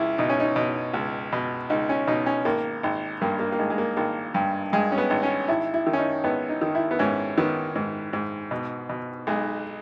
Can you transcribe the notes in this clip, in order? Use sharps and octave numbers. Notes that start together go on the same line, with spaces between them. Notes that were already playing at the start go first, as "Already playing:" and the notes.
Already playing: C#2 E4
B2 D#4
C#4
D#4
B2
C#2
B2
C#2 D#4
C#4
B2 D#4
C#4
G#1 A#3
G#1
G2 A#3
A#3
A#3
G#1 G#3
G#3
A#3
G#1 A#3
G2
G2 G#3
C#4
B3
G#1
C#4
G#1 E4
E4
D#3
C#4
D#4
G#1 B3
D#4
D#3
E4
B3
G#2 C#4
D#3 B3
G#2
G#2
B2
B2
B1 G#3